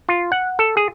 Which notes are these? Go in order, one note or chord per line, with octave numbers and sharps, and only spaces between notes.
F4
F#5
A4
G#4